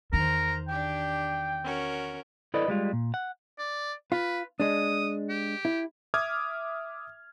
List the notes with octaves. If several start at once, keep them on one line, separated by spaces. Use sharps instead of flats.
E2 D#3 A#4 C5 A#5
D4 G4 G5
C#4 F#4 A#4
E4 A4 B4 D5 D#5
G3 G#3 F4
A#2
F#5
D5
F4 B4
G#3 D4 D#6
G4
E4
E5 D6 D#6 F6 G#6